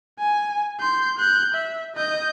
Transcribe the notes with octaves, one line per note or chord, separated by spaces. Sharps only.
G#5
C6 G6
F#6 G6
E5
D#5 G6